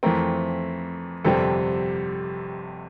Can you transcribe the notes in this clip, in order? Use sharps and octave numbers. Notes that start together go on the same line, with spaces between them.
F2 E3 A3 C4 A#4
G1 F2 C3 G3 C4 A4